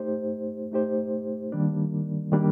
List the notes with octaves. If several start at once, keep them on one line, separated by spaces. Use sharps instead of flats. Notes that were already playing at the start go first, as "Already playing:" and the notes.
Already playing: A3 D#4 G4 C5
A3 D#4 G4 C5
D#3 G3 A#3 D4
D#3 G3 A#3 D4